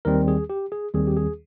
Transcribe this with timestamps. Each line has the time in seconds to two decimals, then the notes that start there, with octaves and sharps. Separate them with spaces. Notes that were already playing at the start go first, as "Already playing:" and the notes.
0.05 D#2 D#3 G3 C4 A#4
0.28 G#4
0.50 G4
0.72 G#4
0.94 D#2 D#3 G3 C4 G#4
1.07 G4
1.17 G#4